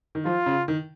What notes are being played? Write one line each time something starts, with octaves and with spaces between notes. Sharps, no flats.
D#3
F3 F4
C#3
D#3